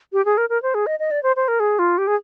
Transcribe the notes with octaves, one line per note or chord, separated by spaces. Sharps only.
G4
G#4
A#4
A#4
C5
G#4
D#5
D#5
D5
C5
C5
A#4
G#4
F4
G4
G#4